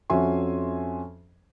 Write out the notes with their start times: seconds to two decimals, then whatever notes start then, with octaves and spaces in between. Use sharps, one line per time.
0.10 F2 C#4 F#4 E5 G#5 C6